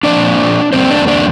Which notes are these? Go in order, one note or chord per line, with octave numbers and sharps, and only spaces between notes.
A#2 F3 C4 D4 D5
E2 D3 G3 A#3 C4 D4 C5
D4 D5
D4 D5